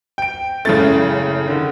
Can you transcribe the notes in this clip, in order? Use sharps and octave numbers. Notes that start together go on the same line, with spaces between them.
G5 D7
F#1 A2 C#3 A3 A6
D3 D#3